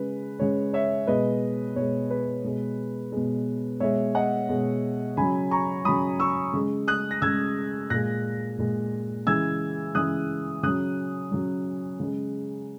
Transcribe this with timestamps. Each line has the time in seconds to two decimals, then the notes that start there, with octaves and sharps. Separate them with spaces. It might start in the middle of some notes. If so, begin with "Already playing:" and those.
Already playing: C#3 G#3 B4
0.39 C#3 G#3 C#5
0.73 C#5 E5
1.07 B2 G#3 B4 D#5
1.76 B2 G#3 C#5
2.10 B4
2.44 B2 G#3
3.12 B2 G#3
3.80 B2 G#3 C#5 E5
4.15 D#5 F#5
4.49 B2 G#3
5.17 C#3 F#3 G#5 B5
5.51 A#5 C#6
5.85 C#3 F#3 B5 D#6
6.20 C#6 E6
6.53 C#3 G#3
6.88 D#6 F#6
7.11 A#6
7.22 C#3 G#3 E6 G#6
7.90 A#2 G#3 F#6 A#6
8.58 A#2 G#3
9.27 C#3 E3 G#3 E6 G#6
9.95 C#3 E3 G#3 D#6 F#6
10.63 C#3 F#3 D#6 F#6
11.31 C#3 F#3
12.00 C#3 G#3